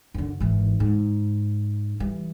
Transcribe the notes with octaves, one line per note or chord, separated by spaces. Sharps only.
F#2 D3
G#1 E3
G#2
E3 G3